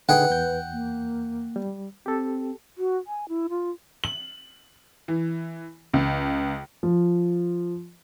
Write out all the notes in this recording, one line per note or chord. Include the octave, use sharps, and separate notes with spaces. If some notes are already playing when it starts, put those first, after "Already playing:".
D3 D#4 G#4 B4 F#5 G5
E2 G6
A#3
G3
C4 G4 A4
F#4
G#5
E4
F4
F#7
E3
C#2
F3